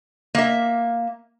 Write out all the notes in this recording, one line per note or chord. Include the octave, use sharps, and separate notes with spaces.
A#3 E5